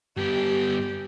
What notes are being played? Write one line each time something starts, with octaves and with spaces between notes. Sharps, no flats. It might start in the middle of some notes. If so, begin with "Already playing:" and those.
G2 B3 G4